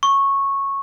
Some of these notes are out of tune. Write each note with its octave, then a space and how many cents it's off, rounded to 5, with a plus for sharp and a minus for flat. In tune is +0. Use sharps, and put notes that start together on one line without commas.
C#6 -10